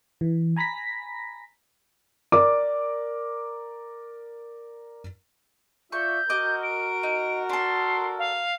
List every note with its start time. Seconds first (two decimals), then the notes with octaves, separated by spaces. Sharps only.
0.21 E3
0.56 G#5 A#5 B5 A#6 B6
2.32 A#4 D5 D6
5.92 F4 D5 E5 C#6 G6
6.30 F#4 A#4 D#5 D6
6.63 D7
7.03 D#4
7.49 D4 A4 C6
8.18 F5